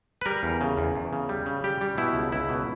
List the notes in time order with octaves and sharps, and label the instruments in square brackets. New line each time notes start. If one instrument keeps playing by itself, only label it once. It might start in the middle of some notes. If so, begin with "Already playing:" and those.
[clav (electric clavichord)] B4
G3 A#4
E2
C#3
E2
E2
C#3
G3
C#3
G3 G4
G3
B2 E4
C#2
C#2 E4
B2